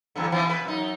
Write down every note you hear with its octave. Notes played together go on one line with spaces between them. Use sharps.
E2 G2 D3
E3 F3 C4
B2 B4
F#2 D#4